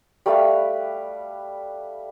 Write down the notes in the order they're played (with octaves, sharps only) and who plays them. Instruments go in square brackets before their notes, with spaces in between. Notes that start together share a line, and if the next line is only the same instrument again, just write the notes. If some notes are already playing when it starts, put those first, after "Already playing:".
[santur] G3 A3 B4 F5